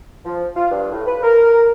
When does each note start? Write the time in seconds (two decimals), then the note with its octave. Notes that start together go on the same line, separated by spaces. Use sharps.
0.25 F3
0.56 F4
0.71 G2
0.92 A2
1.06 B4
1.23 A#4